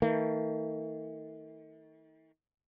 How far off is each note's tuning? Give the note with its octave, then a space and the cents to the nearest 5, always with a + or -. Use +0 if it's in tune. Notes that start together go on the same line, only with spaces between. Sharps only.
D#3 +45 A3 +45